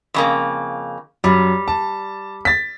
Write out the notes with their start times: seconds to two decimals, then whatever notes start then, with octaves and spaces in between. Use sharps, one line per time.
0.14 F2 C#3 A#3
1.24 F#2 G3
1.68 A5
2.45 A6 B6